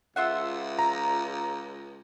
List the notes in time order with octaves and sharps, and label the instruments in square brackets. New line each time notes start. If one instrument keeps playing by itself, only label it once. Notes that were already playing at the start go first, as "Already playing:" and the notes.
[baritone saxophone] C#2 [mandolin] F4 E5 F#5
[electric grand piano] A#5